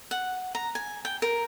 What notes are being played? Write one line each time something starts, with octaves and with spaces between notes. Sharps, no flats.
F#5
A#5
G#5
G5
A#4